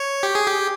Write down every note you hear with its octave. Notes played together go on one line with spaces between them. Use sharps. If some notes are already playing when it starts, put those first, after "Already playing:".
Already playing: C#5
G4
G#4
G4